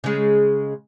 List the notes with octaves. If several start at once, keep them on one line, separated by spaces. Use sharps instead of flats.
C#3 G#3